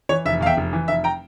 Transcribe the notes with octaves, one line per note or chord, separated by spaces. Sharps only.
E3 C#5
F1 E5
E2 F5
E5 G5
F1
E3
F1 E5
G5 A#5